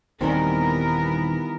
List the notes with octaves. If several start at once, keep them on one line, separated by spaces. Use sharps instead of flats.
D#1 D#2 D#3 E3 G3 B3 C4 A#4